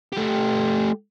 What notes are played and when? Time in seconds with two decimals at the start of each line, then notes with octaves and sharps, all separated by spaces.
0.13 A3 G4